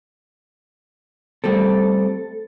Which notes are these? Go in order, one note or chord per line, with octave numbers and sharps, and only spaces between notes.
G3 A3 C4 A4